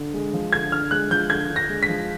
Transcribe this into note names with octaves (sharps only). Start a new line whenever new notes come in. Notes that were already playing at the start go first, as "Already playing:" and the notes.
Already playing: D3
G#3
F3
D3 G#6
D3 F6
G#3 F#6
F3 G6
D3 G#6
D3
A#6
G#3
B6
F3